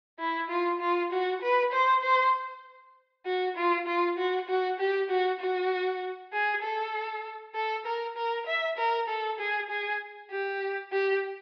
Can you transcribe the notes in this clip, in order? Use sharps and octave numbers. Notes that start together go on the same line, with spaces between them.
E4
F4
F4
F#4
B4
C5
C5
F#4
F4
F4
F#4
F#4
G4
F#4
F#4
G#4
A4
A4
A#4
A#4
E5
A#4
A4
G#4
G#4
G4
G4